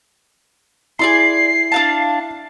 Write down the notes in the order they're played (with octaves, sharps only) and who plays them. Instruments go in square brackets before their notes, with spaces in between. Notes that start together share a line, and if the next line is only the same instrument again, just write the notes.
[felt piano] E4 [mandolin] G#4 D5 C6 [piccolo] C7
[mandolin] D4 F5 A5